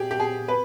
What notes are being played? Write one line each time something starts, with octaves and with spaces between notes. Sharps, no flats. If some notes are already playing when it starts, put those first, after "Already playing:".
Already playing: G4 G#4
G4
G#4
B4